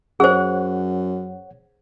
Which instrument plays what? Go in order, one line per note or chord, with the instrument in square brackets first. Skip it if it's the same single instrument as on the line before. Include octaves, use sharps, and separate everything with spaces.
[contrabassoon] F#2 [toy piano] G#4 C5 [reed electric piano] C#5 F#5